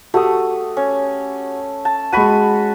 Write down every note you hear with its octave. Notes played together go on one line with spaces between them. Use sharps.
A3 F#4 G4 D#6
C#4
A5
G#3 F#4 B5 C#6 D#7